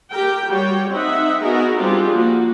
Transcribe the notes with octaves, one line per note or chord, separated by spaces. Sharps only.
G4 A#4 G5
G3 F#4 C#5 G5
C4 D#4 E5 F#5
B3 D#4 F#4 G#4 A#4
G3 C4 D4 F4 G4 G#4
F3 A#3 F#4